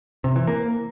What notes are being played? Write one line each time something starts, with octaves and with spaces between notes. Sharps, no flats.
C3
E3
A#3